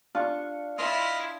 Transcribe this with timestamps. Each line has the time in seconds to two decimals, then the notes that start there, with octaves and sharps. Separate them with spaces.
0.15 D4 F4 C#6
0.78 E4 F4 D#5 C6 D#6 F6